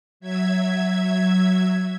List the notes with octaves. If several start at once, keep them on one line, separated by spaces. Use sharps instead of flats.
F#3 E5 G#6